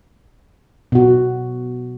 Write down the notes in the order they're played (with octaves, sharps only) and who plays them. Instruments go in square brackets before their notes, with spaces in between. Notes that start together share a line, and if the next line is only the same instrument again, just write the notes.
[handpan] B2 F#4